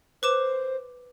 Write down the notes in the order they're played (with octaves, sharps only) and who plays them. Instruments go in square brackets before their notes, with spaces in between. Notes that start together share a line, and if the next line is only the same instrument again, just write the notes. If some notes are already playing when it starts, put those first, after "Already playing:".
[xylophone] B4 D6 E7 [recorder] C5